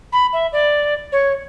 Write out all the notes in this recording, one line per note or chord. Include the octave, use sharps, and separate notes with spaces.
B5
E5
D5
C#5